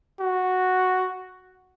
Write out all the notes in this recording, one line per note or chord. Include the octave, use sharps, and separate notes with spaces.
F#4